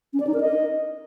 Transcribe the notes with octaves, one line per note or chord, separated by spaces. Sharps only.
C#4
D5
D#4
A#4
D#5